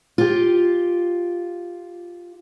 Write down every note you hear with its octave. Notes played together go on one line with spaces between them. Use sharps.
F4 G4